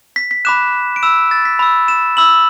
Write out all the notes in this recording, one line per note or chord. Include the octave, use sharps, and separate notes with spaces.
B6
B6
B5 D6 F#6 E7
D7
B5 E6 E7
A6
B6
B5 E6
E7
B5 E6 F#7